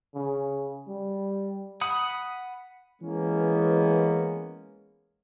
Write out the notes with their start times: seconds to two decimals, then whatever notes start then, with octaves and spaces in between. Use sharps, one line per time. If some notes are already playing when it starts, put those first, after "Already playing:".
0.15 C#3
0.88 G3
1.81 F#5 B5 D#6
3.02 E3 G#3 A#3 B3 C#4